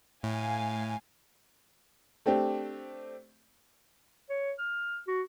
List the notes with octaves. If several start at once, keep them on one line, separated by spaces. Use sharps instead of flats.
A2 A3 F5 G#5
A3 C4 D4 G4
C#5
F6
F#4